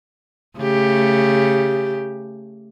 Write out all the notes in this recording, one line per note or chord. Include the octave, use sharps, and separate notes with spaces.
C#3 A3 G4